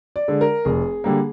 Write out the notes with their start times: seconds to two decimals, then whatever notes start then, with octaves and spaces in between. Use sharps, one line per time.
0.16 D5
0.28 D3 G#3
0.41 A#4
0.65 F1 G#4
1.04 D3 G3 A#3